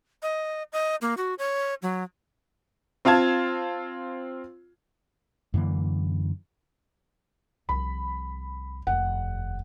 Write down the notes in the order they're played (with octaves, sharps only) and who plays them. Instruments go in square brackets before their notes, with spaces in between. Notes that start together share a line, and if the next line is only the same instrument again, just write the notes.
[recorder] D#5
D#5
A#3
F#4
C#5
F#3
[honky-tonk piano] C4 F4 F5 A5 G#6
[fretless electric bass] F#2 D3 E3 A#3
[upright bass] C2 F3 [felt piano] B5
[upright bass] F1 D#2 [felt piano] F#5